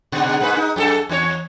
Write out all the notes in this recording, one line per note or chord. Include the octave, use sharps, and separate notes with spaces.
G#2 B2 D3
G#2 A#3 B4
D#4
F#2 G4 A4
E2 D#4 C#5